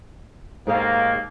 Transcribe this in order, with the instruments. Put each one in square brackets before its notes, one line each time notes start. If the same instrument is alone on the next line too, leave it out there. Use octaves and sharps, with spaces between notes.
[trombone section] D#2 A#3 [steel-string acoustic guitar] G#2 G#4 F5